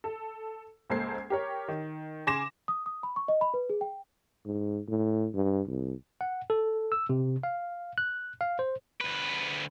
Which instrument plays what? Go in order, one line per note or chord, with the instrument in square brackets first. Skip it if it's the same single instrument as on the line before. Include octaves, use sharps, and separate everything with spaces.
[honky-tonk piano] A4
C#2 A#3 A4 C5 G#6 C7
G4 A#4 C#5
D#3
C#3 G#5 C6 D6 A#6 E7
[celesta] D#6
D#6
B5
C#6
D#5
B5
B4
G#4
G5
[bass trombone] G#2
A2
G2
C2
[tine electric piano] F#5
A4
E6
C3
F5
F#6
F5
C5
[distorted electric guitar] D2 B4